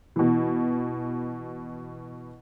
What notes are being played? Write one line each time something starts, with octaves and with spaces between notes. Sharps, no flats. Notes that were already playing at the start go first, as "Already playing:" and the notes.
B2 E3